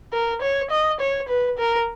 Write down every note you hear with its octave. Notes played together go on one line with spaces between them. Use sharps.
A#4
C#5
D#5
C#5
B4
A#4